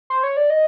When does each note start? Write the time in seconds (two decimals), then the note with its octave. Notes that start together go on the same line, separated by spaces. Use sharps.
0.10 C5
0.23 C#5
0.37 D5
0.50 D#5